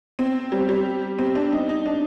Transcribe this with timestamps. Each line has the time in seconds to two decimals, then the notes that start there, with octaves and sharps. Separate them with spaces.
0.19 C4
0.52 G3
0.69 G3
1.19 C4
1.35 D4
1.52 D#4
1.69 D#4
1.86 D4